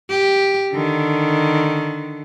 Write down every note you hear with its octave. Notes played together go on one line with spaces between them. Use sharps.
G4
D3 D#3